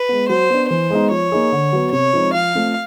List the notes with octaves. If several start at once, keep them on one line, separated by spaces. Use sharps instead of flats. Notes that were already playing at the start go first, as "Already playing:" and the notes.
Already playing: B4
G#3 B3
F#3 C5
B3 D4
E3 C5
G#3 B3 D#4
F3 C#5
A#3 D#4 G#4
D3
F#3 B3
C3 C#5
F3 G#3 C4 D#4
F3 F5
A3 C4 F4 A4